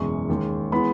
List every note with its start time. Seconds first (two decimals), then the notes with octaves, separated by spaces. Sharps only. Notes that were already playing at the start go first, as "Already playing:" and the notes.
Already playing: F#1 E2 B2 G#3 C#6
0.29 D#2 D#3 G#3
0.72 E3 G#3 B3 B5